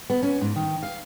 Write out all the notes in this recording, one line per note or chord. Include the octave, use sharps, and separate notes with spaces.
B3
C#4
G#2
D#3
F5